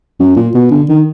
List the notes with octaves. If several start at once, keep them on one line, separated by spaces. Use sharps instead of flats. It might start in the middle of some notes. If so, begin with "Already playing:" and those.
F#2
A#2
B2
D3
D#3